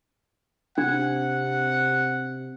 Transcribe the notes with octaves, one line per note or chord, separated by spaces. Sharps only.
C3 D4 F#5